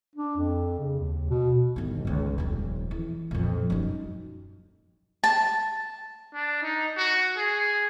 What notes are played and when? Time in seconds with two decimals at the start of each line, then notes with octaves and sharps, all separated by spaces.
0.16 D4
0.37 F2
0.79 C#3
1.00 D#2
1.30 B2
1.76 G1 D#3
2.05 C#2 D3
2.38 D#1 F2
2.91 E3
3.31 F2 A#2
3.70 F#2 D#4
5.24 A5
6.34 D4
6.62 D#4
6.96 F#4
7.37 G#4